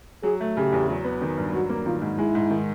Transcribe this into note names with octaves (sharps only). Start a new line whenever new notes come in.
F#3 G#4
A3
C#3 G4
E2
F#3
B3
D#3
G2
F#3 F#4
A#3
D#3 F4
G#2
G#3 E4
G#2
D#3